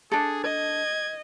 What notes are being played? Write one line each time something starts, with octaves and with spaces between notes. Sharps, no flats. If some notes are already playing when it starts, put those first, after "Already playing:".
D4 G#4 A4
D#5 G#6